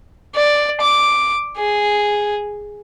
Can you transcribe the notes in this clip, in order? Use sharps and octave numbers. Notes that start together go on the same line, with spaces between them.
D5
D6
G#4